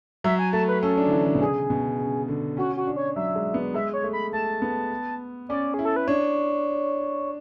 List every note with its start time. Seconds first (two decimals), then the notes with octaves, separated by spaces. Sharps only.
0.24 F#3 E5
0.39 G#5
0.53 A3 A5
0.68 B4
0.83 C#4 A4
0.97 D4
1.07 D3
1.11 E3
1.26 D3
1.35 B2
1.40 C#3 G#4
1.70 B2
1.99 C#3
2.28 D3
2.57 C#4 F#4
2.77 F#4
2.87 D4
2.96 C#5
3.16 F#3 E5
3.35 G#3
3.54 B3
3.74 G#3 E5
3.93 C#5
4.03 A3
4.13 B5
4.33 A3 A5
4.62 B3
5.49 C#4 D5
5.74 E4 G#4
5.85 A4
5.96 B4
6.08 D4 C#5